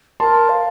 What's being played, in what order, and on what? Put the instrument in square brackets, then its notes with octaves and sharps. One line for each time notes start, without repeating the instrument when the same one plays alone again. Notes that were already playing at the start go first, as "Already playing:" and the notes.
[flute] A#4 [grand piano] A5 C6
[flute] F5